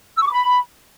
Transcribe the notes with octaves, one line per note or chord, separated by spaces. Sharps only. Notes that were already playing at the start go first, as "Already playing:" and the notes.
E6
C#6
D6
B5